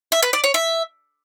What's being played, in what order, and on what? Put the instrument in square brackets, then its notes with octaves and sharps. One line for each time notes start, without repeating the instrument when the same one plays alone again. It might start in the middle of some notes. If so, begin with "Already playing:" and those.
[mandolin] E5
B4
D5
C#5
E5